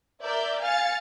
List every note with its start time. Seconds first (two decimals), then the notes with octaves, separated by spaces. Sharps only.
0.22 A#4 D5 E5 G6
0.61 F5 G#5 F6 A6 C#7